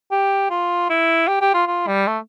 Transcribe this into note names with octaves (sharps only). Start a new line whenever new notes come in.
G4
F4
E4
G4
G4
F4
F4
G3
A3